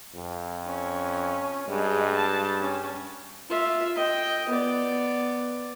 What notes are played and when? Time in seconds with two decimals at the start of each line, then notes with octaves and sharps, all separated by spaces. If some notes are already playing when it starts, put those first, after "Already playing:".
0.15 F2
0.67 C#4
1.69 G2 G#3
2.16 A5
2.60 C#4
3.49 F4 E5
3.96 D#5 G5
4.49 B3 D5